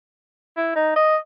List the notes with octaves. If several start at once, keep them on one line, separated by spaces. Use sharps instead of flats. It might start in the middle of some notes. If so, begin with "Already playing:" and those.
E4
D#4
D#5